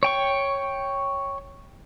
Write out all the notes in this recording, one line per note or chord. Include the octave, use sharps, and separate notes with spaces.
C#5 G5 C#6